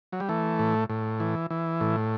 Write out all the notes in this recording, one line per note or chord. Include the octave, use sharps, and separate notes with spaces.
F#3
G3
E3 A3
A2
A2
E3
E3
A2